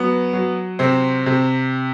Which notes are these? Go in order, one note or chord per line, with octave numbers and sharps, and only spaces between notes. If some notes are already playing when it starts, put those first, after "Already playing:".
Already playing: F#3 B3
F#3
C3 C4
C3